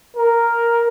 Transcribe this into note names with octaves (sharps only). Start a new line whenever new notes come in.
A#4